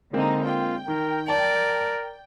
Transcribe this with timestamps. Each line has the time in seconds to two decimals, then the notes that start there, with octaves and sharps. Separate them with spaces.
0.13 D3 G#3 A#3 C4 D#4
0.44 F4 G5
0.88 D#3 A#4
1.28 A#4 D5 A5